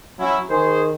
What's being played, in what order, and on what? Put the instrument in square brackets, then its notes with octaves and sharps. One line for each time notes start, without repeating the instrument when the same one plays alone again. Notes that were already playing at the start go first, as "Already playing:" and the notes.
[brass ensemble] F#3 C#4 E4
[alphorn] D#3 [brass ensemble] G#4 C5